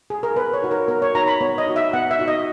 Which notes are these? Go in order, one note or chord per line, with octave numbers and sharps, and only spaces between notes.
G#4
A#4
B3 B4
C#5
D#4 F#4
A#4
B3 A#4
C#5
D#4 F#4 A#5
B5
B3 C#5
D#5
D#4 F#4
E5
B3 F#5
E5
D#4 F#4
D#5